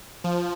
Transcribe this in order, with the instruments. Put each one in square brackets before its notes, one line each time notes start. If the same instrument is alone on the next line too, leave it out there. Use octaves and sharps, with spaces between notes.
[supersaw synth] F3